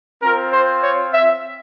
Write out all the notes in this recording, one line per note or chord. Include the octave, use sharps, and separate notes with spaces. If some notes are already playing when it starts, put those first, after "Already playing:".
C4 F4 A#4
C5
C#5
E5